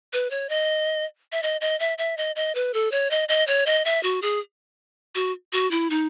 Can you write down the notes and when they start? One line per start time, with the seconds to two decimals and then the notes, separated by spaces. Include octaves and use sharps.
0.13 B4
0.31 C#5
0.49 D#5
1.32 E5
1.43 D#5
1.61 D#5
1.80 E5
1.98 E5
2.17 D#5
2.36 D#5
2.55 B4
2.74 A4
2.92 C#5
3.11 D#5
3.29 D#5
3.47 C#5
3.66 D#5
3.85 E5
4.03 F#4
4.22 G#4
5.15 F#4
5.53 F#4
5.71 E4
5.90 D#4